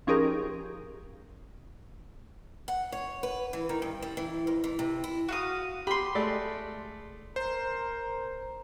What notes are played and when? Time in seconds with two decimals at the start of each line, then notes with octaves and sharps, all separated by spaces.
0.07 F3 C#4 D#4 G4 G#4 A#4
2.68 F#5
2.92 C#5
3.23 B4
3.53 E3
3.69 D#3
3.82 G2
4.02 G3
4.17 E3
4.47 F2
4.64 E3
4.79 C3
5.04 E4
5.29 F#4 F5 D#6
5.87 G4 B5 C6
6.15 G#3 A3 D5
7.36 A#4 C5